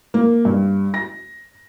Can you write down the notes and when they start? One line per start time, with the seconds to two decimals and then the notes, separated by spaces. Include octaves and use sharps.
0.14 A#3
0.45 G2
0.94 A#6